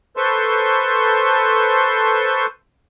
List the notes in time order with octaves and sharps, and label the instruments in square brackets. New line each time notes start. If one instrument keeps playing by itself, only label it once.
[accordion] A4 B4 C5 A5 C6 C#6